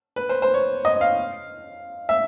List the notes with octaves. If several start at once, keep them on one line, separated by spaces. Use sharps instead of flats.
B4
C5
C5
C#5
D#5
F5
E5